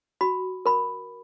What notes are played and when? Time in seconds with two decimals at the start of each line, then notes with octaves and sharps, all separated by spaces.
0.21 F#4 B5
0.66 A#4 B5